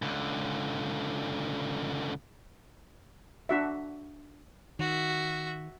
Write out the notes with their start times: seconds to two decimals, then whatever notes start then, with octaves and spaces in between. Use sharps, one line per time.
0.02 C#2 D3
3.49 D4 F#4 E5
4.79 D#3 F#4 E5